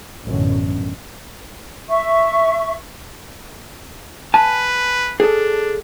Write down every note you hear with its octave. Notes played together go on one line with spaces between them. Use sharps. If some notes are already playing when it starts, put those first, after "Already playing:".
A1 F#2 B2 D3 C#4
E5 C#6
B4 G#5 A5
D4 G#4 A4